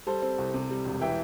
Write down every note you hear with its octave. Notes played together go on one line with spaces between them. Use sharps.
G3 A4 C5
C4
C2
C3
G3
E1
E3 E5 G5